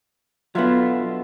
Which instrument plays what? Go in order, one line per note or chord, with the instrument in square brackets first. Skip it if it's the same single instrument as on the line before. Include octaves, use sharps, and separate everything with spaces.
[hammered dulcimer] B2 D3 E5 [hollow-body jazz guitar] F#3 B3 [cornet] F4